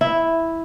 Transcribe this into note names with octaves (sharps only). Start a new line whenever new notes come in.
E4